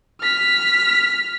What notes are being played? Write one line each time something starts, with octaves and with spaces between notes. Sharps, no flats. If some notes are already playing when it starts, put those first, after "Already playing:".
F6 B6